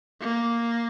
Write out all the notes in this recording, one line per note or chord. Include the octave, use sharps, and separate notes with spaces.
A#3